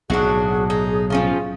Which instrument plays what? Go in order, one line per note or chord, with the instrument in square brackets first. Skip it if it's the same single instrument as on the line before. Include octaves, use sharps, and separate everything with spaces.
[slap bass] B1 A2 [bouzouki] D4 F#4 [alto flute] G#4
[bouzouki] D#4
F3 C#4 F4